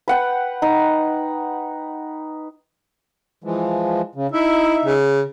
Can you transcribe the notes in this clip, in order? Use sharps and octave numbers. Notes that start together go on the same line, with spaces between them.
B4 F#5 G5
D#4
E3 F3 G#3
C#3
D#4 E4 E5
C#3